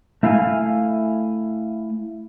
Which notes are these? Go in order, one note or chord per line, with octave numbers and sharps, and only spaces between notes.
A3 E4 F5 G5 G#5